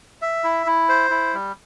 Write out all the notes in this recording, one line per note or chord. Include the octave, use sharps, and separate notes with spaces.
E5
E4
E4
C5
E4
G3